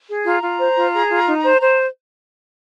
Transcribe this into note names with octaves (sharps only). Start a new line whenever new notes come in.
G#4
F4 A#5
F4
C5
F4
G#4
F4
D#4
C5
C5